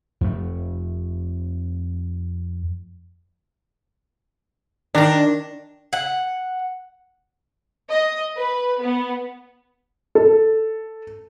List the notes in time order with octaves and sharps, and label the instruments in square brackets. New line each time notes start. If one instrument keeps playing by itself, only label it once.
[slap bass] F2 A3
[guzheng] D#3 A#5 [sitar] D4
[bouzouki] F#5
[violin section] D#5
B4
B3
[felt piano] A4